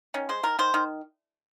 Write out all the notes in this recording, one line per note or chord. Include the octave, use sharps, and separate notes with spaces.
D#3 C#4
G#3 C5
D#3 A#4
D#3 C5
D#3